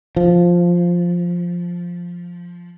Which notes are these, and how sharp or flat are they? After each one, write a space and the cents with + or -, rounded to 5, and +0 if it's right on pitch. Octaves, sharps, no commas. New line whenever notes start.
F3 +0